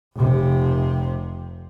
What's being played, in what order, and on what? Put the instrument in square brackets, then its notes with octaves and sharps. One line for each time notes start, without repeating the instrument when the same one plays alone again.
[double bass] F1 C3